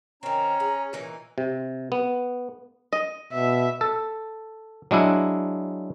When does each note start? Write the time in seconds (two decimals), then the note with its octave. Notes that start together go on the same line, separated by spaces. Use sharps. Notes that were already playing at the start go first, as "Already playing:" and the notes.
0.23 D#3 C4 C#4 A#5
0.60 G#4
0.93 A#2 E3 D#4
1.38 C3
1.92 B3
2.93 D#5
3.33 B2 E5
3.81 A4
4.91 F#3 G#3 D4 E4